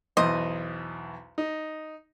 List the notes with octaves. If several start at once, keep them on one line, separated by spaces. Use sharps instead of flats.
B1 E2 C5 D#5
D#4